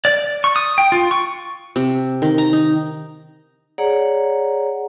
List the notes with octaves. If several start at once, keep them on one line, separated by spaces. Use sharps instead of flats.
D5
C#6
D#6
G5
F4
C#6
C3
D#3
A#5
D#4
G#4 C#5 D5 F#5 A#5